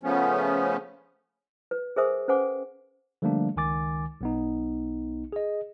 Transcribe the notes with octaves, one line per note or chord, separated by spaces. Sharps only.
C#3 F3 A3 B3 C#4
B4
G#4 A#4 C5 E5 G#5 D#6
C#4 B4 C5 F#5 G#5 D6
D3 F3 G3 A3 A#3 D4
C#2 D#3 G#5 D6 A6
B1 B3 D#4
G#4 D#5